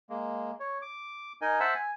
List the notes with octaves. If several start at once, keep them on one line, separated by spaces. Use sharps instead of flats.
G#3 A#3
C#5
D6
D#4 A#4 D#5 G#5
C5 E5 F#5 A5 E6
G#5